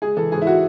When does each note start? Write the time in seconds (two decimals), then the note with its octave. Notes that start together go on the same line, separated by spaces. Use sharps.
0.02 G#3 G#4
0.17 E3 A4
0.32 G#2 G#4
0.42 E4
0.47 F#4